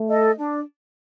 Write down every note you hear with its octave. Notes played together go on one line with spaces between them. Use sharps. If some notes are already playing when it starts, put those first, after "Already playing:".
Already playing: A3
A4 D#5
D4